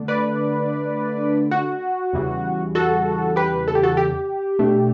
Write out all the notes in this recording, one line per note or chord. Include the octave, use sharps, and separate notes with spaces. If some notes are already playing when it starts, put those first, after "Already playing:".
Already playing: D3 A3 D4
B4 D5
F#4
E2 C#3 E3 G3
F#4 A4
G4 B4
A4
G4
F#4 A4
G4
B2 A3 D4